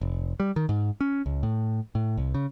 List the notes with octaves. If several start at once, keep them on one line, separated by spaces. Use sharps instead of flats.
F1
G3
D#3
G#2
C#4
C#2
A2
A2
C2
C#3